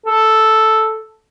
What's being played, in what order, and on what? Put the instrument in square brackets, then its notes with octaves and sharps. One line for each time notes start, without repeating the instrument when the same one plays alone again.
[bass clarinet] A4